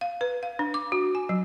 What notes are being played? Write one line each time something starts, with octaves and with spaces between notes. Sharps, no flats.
F5
B4
F5
D4
D6
F#4
G#5
F#3